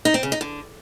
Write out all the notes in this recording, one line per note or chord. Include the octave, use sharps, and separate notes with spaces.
D#4
C4
C#3
D#4
D3